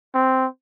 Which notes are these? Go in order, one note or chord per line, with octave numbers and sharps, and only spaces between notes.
C4